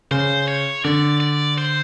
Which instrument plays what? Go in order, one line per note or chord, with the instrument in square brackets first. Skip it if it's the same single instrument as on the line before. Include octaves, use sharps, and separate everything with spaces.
[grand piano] C#3 [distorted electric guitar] C5
[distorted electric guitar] C#5
[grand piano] D3 [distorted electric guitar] D5
[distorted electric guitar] D5
C5